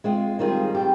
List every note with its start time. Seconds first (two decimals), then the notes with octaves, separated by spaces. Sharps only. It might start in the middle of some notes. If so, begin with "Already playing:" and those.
0.04 G#3 C4 F4
0.39 D#3 G3 C4 F4 G#4
0.75 G3 C4 G4